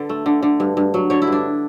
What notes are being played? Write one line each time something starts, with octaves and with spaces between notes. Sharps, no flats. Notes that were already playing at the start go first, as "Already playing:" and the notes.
Already playing: D3 A4 B4
A3
D3
D3
G2
G2
F#3
D3 C#5
E4
G2
D4